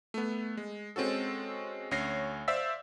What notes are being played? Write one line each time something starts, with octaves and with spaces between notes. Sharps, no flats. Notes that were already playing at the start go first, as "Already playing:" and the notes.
A3 B3
G#3
G#3 C4 C#4 F#4 A4
D2 C#4 C#5 A#6 C7
C5 D5 E5 F5 E6 B6